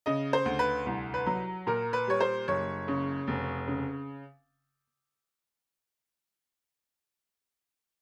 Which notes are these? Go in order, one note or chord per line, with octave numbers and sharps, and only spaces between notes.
C#3 D#5
C5
D2
B4
C2
B4
F#3
A#2 A#4
B4
G3 C#5
C5
F#1 C#5
C#3
F1
C#3